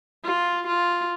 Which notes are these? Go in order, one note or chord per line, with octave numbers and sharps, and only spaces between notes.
F4
F4